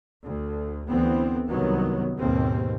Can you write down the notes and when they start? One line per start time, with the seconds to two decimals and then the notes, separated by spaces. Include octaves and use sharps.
0.25 D2
0.89 D2 E3 B3 C4
1.48 C2 F#2 D#3 F#3 B3
2.19 D#2 G#2 B2 A#3 C4